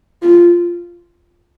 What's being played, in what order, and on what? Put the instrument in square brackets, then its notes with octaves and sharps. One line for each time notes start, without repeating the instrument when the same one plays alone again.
[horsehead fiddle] F4